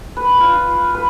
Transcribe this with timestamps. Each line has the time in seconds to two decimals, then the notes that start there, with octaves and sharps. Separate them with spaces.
0.17 B4
0.40 F4
0.95 B4